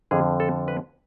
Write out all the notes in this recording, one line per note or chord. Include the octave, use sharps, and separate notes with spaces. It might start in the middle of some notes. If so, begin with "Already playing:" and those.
F2 D3 F3 G#4
A4
B4